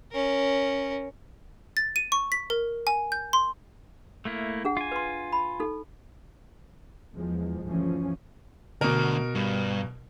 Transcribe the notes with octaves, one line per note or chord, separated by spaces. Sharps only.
C#4 A#4
A6
D#7
C#6
B6
A#4
G#5
G6
C6
A3 A#3 E4
D4 G#4 F#5
F4 G#5
B4 C6
B5
D#4 A4
E2 F3 G#3
G1 D2 E3 F3 C#4
D2 B2 D3 A#4
G2